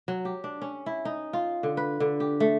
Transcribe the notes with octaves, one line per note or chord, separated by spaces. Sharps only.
F#3
G4
D4
C#4
E4
D#4
F4
D3
B4
D3
G4
A3